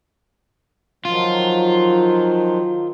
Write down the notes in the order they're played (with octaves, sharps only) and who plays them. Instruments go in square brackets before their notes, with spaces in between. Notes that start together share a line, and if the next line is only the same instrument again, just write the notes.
[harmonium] D#3 F3 F#3 [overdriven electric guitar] F4